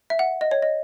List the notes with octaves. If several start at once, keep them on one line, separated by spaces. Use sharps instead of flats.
E5
F#5
D#5
C#5
D#5